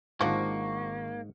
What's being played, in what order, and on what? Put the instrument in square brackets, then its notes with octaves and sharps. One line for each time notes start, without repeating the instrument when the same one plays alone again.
[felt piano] G#1 F4 C#6 [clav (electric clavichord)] G#2 [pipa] F3 D4 F#4 [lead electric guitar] A#3